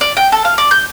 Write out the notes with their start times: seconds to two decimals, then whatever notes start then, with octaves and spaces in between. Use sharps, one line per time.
0.01 D5
0.17 G5
0.32 A4
0.45 F5
0.58 D5
0.71 G6